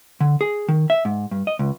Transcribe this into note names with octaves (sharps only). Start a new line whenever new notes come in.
D3
G#4
D#3
E5
G#2
G2
D#5
C#2